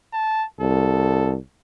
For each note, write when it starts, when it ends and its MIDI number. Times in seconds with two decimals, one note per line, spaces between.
0.14 0.45 81
0.61 1.36 36
0.61 1.34 69